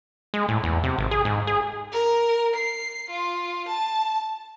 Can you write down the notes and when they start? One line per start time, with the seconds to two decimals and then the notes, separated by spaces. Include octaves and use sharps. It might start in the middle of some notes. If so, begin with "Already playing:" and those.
0.34 G#3
0.49 A2
0.64 E2
0.84 C3
0.98 G#1
1.11 G#4
1.25 G#2
1.47 G#4
1.92 A#4
2.55 C7
3.10 F4
3.68 A5